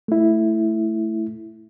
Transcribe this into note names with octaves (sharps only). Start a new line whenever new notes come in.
A3 E4